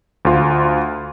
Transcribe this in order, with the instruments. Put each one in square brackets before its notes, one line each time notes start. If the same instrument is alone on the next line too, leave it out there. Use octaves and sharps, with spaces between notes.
[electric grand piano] D2 F4